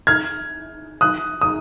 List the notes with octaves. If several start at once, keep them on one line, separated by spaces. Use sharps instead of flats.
F6 G#6
D#6 F#6
D#6